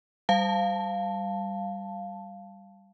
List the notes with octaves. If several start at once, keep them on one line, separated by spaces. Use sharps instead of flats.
G3 F5 A5